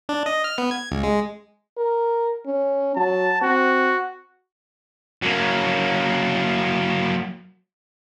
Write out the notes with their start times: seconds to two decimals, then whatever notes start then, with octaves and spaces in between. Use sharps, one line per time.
0.09 D4
0.26 D#5
0.44 F6
0.58 B3
0.71 G#6
0.91 C#2
1.04 G#3
1.78 A#4
2.46 C#4
2.96 F#3 A5
3.42 C4 F#4
5.22 F#3 A#3